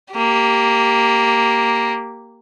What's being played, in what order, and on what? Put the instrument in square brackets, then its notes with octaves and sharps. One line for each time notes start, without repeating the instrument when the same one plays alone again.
[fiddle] A#3 G4